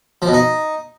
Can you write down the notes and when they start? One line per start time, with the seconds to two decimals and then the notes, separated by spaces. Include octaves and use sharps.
0.22 F3
0.28 B2
0.33 D#4